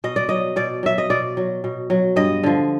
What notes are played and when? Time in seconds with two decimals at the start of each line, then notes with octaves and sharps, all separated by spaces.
0.04 B2 D#5
0.16 D5
0.29 F#3 D#5
0.56 B2 D5
0.83 F#3 E5
0.98 D#5
1.10 B2 D5
1.37 F#3
1.64 B2
1.90 F#3
2.16 G2 D#5
2.43 D3 F3